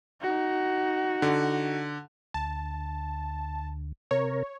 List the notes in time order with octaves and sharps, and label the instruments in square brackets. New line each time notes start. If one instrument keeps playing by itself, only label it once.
[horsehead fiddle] D#4 F#4
[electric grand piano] D3
[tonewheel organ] D2 [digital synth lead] A5
[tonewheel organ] C3 A#4 [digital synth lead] C#5